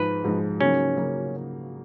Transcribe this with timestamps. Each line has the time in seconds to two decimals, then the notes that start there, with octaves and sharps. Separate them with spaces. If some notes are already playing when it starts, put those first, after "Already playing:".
Already playing: G#2 F3 G#3 D#4 B4
0.24 G#2 F3 G#3 D#4
0.61 C#3 F#3 A#3 C#4 D#4
0.97 C#3 F#3 A#3 D#4